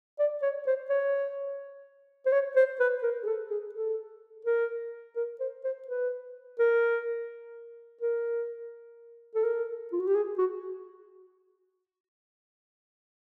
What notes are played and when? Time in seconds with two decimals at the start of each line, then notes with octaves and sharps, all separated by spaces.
0.19 D5
0.42 C#5
0.67 C5
0.90 C#5
2.26 C5
2.32 C#5
2.56 C5
2.80 B4
3.03 A#4
3.23 G#4
3.27 A4
3.50 G#4
3.74 A4
4.45 A#4
5.16 A#4
5.40 C5
5.64 C5
5.88 B4
6.59 A#4
8.01 A#4
9.35 A4
9.44 A#4
9.92 F4
10.00 F#4
10.07 G4
10.15 G#4
10.38 F#4